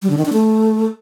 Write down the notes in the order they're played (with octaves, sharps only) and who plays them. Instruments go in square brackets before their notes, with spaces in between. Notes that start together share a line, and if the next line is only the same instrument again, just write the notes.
[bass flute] G3
D3
D#3
D4
A3